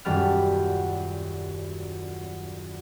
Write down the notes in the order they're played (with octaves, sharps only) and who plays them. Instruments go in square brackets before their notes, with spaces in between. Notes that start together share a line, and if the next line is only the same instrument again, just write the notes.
[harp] D#1 F#2 G3 A5 B5 F6